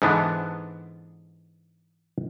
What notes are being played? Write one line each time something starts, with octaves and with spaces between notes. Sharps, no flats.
G#2 D3 E3 B3 D4